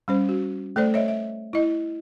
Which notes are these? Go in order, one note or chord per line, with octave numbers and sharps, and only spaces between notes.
G3 C#4 C5
F#4
A3 A4 C5 D5
C#5 D#5 E5
E5
E4 D#5